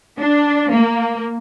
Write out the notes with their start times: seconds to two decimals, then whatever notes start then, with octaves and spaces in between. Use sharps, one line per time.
0.20 D4
0.72 A#3